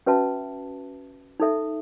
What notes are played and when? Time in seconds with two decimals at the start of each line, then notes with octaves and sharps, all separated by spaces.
0.06 C#4 F#4 B4 E5 A5
1.40 D#4 A4 E5